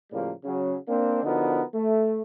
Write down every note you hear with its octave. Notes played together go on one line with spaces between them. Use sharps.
A2 C#3 F3 G3 A#3
C#3 F#3
A#3 C4 D4
D3 F3 B3 D#4 F#4 A#4
A3